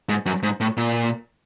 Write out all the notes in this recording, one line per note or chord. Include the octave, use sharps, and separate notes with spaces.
G#2
F#2
G#2
A2
A#2